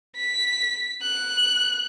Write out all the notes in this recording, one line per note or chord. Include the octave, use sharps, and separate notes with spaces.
B6
F#6